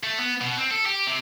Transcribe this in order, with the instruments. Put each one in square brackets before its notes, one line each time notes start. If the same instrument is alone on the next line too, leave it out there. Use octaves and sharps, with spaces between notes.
[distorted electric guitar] A3
B3
B2
C4
A4
G4
C3